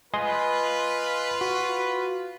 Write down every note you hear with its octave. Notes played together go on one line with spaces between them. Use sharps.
F4 B4 D#5 G#5 C6
F#4